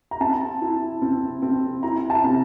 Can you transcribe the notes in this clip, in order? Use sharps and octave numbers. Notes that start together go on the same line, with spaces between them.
A#5
C4 A5
E4
C4
C4
E4 A#5
A5
C3